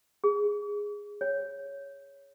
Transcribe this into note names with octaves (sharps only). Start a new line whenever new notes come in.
G#4
C#5